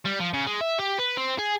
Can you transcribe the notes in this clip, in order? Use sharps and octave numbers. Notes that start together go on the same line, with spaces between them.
G3
F3
C#3
G#3
E5
G4
B4
C4
G#4